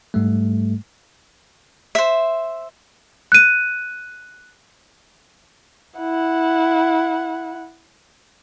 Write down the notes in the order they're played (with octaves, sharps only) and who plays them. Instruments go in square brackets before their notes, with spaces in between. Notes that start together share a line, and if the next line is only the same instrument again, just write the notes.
[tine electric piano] G#2 G3 A3
[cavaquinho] C5 E5
[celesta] F#6 D#7
[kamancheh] E4 F#5